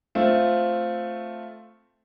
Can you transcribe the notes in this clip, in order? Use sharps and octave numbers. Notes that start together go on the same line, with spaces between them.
A3 C4 F4